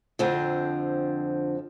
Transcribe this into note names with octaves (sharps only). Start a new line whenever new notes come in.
F2 D3 F3 C4